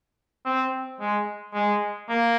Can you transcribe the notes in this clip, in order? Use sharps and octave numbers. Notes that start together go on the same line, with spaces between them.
C4
G#3
G#3
A#3